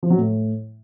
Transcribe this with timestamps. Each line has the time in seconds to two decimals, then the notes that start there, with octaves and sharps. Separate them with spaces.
0.03 F3
0.10 F#3
0.18 A2